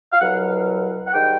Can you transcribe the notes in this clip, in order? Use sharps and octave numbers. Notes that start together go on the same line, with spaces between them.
F5
C2 B2 F#3 F#5
F#5
G#2 D#3 G3 G5